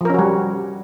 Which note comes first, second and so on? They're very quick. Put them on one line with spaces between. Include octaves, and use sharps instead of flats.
F3 A#4 C#4 F#4 G3